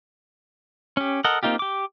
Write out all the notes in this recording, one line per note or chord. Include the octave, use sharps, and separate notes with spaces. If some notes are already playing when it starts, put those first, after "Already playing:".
C#4 G4
A4 A#4 D#5 F#5
A#3 C4 D#4 F4 G4
G4 D6